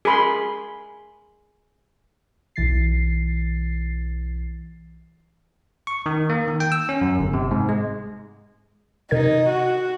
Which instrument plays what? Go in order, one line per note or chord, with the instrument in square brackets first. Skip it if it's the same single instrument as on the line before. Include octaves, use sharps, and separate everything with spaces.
[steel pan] G#4 A#4 B5 C6
[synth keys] B1 E3 A6 C7
[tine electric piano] C#6
D#3
A#3
D#3
G5
E6
C#4
F#2
G1
C3
G#2
G#3
[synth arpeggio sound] C3 A#4 G#6 [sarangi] D#4
[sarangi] F#4